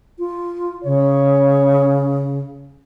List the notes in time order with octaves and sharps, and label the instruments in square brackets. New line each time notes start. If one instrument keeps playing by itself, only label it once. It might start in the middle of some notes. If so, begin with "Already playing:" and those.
[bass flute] F4
[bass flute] C#3 [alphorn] C#5